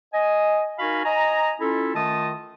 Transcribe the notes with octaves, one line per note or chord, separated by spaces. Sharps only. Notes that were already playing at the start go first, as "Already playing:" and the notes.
D#5 G#5
D#4 F#4 A#4 F5 G#5 B5
D#5 G#5 A#5
C#4 E4 F4 A4
D#3 A3 F4 D#5 A5 D#6